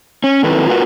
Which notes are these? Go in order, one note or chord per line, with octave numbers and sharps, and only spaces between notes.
C#4
F#2 D#3 C4 E4 A4 B4
F4 F#4 A#4 B4 F5 F#5